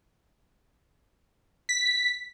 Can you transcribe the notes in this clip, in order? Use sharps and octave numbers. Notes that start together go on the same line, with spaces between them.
B6